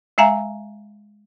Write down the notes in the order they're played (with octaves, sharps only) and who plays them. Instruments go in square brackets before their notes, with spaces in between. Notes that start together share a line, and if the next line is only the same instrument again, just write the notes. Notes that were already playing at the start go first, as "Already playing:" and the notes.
[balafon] G#3 E5 F5 G#5 A#5